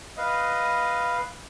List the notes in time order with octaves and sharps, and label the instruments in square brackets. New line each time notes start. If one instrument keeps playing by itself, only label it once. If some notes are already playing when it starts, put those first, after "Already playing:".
[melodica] B4 F5 [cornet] D#5